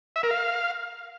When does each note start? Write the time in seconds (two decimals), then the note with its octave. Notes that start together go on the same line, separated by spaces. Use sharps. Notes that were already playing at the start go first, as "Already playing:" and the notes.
0.16 E5
0.23 A#4
0.31 F5